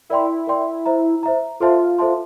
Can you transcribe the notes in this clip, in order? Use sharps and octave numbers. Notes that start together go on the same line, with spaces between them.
E4 A#4 D5 G5 C6
A#4 D5 G5 C6
C5 E5 A#5
C5 E5 A#5
F4 A4 C5 E5 A5 C6
A4 C5 E5 A5 C6